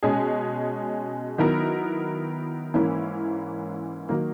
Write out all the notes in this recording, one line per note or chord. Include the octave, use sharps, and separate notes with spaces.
B2 G#3 C#4 G#4
D#3 F#3 B3 E4 A#4
G#2 E3 A#3 C#4 E4
D#3 F#3 A#3